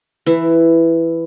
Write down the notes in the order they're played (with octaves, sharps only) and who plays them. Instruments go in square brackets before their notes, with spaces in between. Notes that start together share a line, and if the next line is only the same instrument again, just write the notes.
[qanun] E3 E4